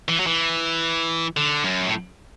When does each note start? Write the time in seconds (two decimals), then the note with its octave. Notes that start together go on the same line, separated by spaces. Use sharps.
0.08 E3
0.20 F#3
0.27 E3
1.37 D3
1.64 F#2
1.87 A2